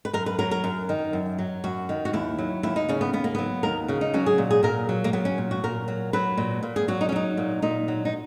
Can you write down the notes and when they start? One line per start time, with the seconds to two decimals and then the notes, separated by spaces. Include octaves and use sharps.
0.05 B4
0.13 F#2 A#4
0.26 B4
0.38 F#3 A#4
0.51 A#4
0.64 F#2
0.89 D#3
1.13 F#2
1.39 F#3
1.64 F#2 F#4
1.89 D#3
2.05 F#4
2.13 D#2 E4
2.38 F#3
2.63 D#2 E4
2.76 D#4
2.89 C#3 C#4
3.01 B3
3.13 D#2 B3
3.24 A#3
3.35 F#3 B3
3.63 D#2 A#4
3.88 C#3 F#4
4.01 D#4
4.14 F#3 C#4
4.26 G#4
4.38 A#2
4.51 G#4
4.63 A#2 A#4
4.89 F#3
5.04 A#3
5.13 F#3 B3
5.25 C#4
5.38 A#2
5.51 F#4
5.64 A#2 A#4
5.88 F#3
6.13 F#3 B4
6.37 A#2
6.63 A#2
6.76 G#4
6.88 F#3 F#4
7.01 D#4
7.09 C#4
7.12 F#3 D#4
7.37 A#2
7.62 A#2 D#4
7.88 F#3
8.05 D#4